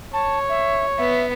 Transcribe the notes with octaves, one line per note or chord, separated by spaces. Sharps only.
C#5 A5
E5
B3 E5